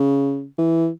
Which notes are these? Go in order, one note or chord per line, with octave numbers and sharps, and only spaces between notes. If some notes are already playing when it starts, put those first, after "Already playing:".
Already playing: C#3
E3